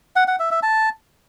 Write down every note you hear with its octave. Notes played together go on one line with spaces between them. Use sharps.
F#5
F#5
E5
E5
A5